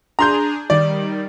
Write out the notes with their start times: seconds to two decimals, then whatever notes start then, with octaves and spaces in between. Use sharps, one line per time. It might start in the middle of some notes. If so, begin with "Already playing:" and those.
0.19 D4 G#4 A#5 C6 G6
0.70 D#3 G3 D5